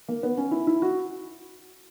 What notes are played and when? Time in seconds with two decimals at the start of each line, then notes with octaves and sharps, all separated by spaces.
0.08 A#3
0.23 B3
0.37 C#4
0.51 E4
0.67 E4
0.82 F#4